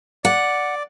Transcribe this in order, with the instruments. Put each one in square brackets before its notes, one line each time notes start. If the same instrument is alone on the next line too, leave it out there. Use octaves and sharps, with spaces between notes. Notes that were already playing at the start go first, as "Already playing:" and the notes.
[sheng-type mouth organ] D5 [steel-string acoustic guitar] F#5